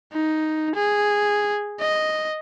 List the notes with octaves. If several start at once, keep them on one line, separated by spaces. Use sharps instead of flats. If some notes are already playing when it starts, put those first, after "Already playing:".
D#4
G#4
D#5